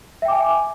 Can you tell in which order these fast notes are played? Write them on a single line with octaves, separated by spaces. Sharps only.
E5 G5 D6 G#5